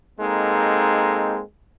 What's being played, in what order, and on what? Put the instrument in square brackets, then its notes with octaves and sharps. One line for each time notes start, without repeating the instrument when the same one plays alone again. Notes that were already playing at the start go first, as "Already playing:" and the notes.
[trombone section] G#3 A#3 C4 D#4 A4